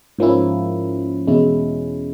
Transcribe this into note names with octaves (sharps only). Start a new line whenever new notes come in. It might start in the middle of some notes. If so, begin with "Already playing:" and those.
G#2 F3 A#3 C#4 E4
E2 B2 G#3 C#4 E4